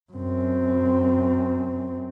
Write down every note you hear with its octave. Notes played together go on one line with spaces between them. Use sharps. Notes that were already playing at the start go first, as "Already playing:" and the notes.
F#2 C4